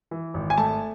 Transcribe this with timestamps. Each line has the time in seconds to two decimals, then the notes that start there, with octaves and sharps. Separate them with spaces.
0.11 E3
0.34 G#1
0.50 G#5
0.58 A3 A5